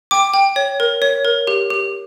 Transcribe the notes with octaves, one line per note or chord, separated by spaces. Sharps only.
G5 D6
G5
C#5
A#4
C#5
A#4
G4
G4